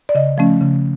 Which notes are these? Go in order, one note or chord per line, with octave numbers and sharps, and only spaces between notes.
D5
C#3 D#5
F3 A3 C#4
C#3